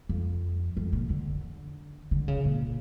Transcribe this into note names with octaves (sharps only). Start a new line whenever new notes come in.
F2
F2
A#2
D3
D3
C#3
A#2